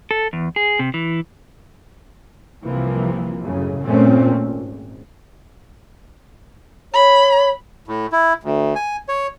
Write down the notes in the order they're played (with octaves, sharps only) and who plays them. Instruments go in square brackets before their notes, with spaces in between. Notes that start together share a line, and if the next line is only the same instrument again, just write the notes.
[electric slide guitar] A4
E2
G#4
C3
E3
[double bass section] C2 C3 E3 F3 A#3
F#2 A2 C#3
G1 A#2 A3 C4 C#4
G#1
[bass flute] C#5 [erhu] B5
[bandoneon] A2
E4
D2
G#5
C#5